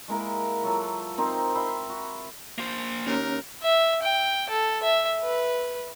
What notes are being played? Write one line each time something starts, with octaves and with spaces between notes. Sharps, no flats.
G#3 A#3 E4 A#4
F#3 F4 A4
C4 D#4 A#4 C5
E5 G5 B5 C6
F#4
A#3 C5
D#2 C#4 A#4 C#5
E5
G5
A4
E5
B4